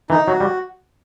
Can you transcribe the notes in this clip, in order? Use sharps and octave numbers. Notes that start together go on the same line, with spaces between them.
E3 D#4
F#3 F#4
G3